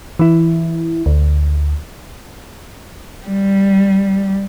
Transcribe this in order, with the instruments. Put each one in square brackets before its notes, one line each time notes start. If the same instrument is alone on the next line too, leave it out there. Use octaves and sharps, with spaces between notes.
[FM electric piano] E3 E4
D2
[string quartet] G3